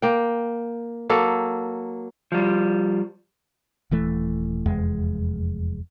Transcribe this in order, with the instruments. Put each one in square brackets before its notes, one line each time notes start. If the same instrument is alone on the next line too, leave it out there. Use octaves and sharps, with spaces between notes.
[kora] A#3 G5
F#3 A#3 A4
[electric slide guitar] F3 G3
[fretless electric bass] D#1 E3 A3
F1 E2 G#3